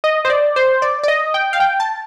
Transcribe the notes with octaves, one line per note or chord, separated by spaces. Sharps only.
D#5
C5
D5
C5
D5
D5
D#5
G5
F5
G5
A5